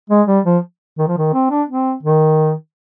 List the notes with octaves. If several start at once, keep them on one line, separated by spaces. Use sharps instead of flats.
G#3
G3
F3
D#3
F3
D#3
C4
D4
C4
D#3